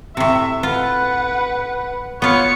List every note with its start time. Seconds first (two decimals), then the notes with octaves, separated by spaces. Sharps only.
0.17 A2 C3 E5
0.63 F4 B4 F#5
2.22 B3 F4 C#5 C#7